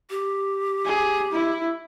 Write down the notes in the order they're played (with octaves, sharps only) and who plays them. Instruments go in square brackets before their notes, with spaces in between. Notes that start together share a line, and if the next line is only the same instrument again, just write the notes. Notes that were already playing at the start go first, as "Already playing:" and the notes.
[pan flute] G4
[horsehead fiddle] G#4
E4